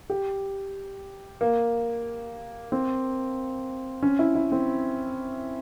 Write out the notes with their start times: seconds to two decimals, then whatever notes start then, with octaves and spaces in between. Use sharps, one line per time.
0.10 G4
1.41 A#3
2.72 C4
4.02 C#4
4.19 E4
4.35 E4
4.52 C4